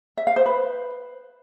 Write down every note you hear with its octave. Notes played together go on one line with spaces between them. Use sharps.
E5
F5
C5
B4